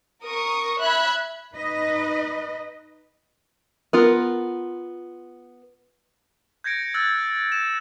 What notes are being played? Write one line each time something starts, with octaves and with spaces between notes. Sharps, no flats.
A#4 C#6 D#6
E5 B5 F#6 G#6
D#4 B4 D#5
B3 F4 A#4
G6 G#6 A#6 C#7 D7
E6 F#6 G6 A6
E7